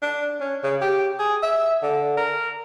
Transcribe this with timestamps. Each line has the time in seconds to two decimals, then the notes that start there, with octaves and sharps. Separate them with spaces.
0.02 D4
0.40 C#4
0.64 C#3
0.81 G4
1.19 G#4
1.42 E5
1.82 D3
2.17 A#4